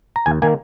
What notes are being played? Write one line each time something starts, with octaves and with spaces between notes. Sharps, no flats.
A#5
D#2 G#5
D#3 A#3 G#5